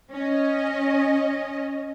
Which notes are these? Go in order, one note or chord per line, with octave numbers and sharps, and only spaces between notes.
C#4 D#5